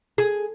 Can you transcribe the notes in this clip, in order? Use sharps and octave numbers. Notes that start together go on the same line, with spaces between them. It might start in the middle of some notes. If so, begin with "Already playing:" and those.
G#4